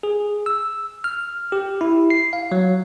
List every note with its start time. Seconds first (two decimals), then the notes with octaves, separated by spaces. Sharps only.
0.03 G#4
0.46 E6
1.04 F6
1.52 G4
1.81 E4
2.10 C7
2.33 F5
2.52 F#3